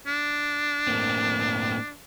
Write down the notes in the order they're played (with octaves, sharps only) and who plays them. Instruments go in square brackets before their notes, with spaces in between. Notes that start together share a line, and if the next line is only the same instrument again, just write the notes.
[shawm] D4
[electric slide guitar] A2 A#3 C4